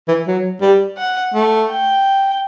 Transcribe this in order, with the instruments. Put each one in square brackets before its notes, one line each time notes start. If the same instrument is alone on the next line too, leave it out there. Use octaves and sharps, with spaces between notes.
[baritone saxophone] E3
F#3
G3
[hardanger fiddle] F#5
[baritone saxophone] A3
[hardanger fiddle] G5